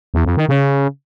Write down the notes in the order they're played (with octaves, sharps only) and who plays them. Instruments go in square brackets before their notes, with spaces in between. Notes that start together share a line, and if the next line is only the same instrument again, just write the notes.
[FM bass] E2
F2
D#3
C#3